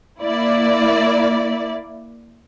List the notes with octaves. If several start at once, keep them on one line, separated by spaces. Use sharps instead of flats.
A#3 E4 D5